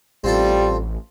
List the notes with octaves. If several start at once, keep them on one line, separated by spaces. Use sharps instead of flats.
A1 G3 C4 F4 A4